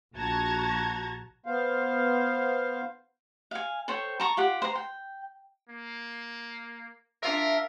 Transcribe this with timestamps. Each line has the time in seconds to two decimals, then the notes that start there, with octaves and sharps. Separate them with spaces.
0.16 A#1 F#4 A5 A#5 G#6 A#6
1.46 B3 C5 F5
3.51 F5 G#5
3.88 A4 C5 C#5 G5
4.20 A5 A#5 C#6
4.37 F4 G4 F#5
4.62 C5 A#5
4.75 G5
5.69 A#3
7.23 D4 F4 A#4 E5